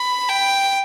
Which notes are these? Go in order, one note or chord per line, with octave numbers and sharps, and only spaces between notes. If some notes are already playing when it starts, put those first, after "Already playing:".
Already playing: B5
G5